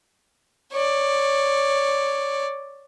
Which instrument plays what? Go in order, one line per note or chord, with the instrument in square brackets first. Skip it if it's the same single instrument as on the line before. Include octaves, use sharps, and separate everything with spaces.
[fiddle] C#5 D5